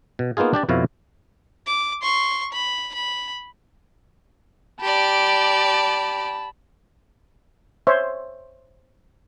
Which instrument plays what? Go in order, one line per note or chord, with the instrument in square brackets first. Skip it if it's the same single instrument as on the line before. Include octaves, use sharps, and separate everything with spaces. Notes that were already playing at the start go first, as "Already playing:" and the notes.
[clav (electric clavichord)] B2
A#3 B3 D#4 F4 G#4
D4 G4 D5
F2 B2 E4 C#5 F5
[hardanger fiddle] D6
C6 C#6
B5
B5
[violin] G4 D5 [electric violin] A5 B5
[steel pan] C5 C#5 E5